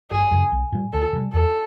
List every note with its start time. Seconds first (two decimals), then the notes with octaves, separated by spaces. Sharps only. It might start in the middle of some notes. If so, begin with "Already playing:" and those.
0.11 G1 G#4
0.31 F#2 C#3
0.52 B1
0.72 A#2 G3
0.93 D2 A4
1.13 C3 D#3 G3
1.33 E2 A4